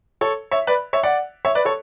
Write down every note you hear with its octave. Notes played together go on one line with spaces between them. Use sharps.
A4 C#5
C#5 E5
B4 D5
C#5 E5
D5 F#5
C#5 E5
B4 D5
A4 C#5